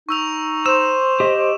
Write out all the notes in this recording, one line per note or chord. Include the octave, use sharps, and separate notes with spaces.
D#4 C#6 E6 F7
C5 E6 E7
G4 D#5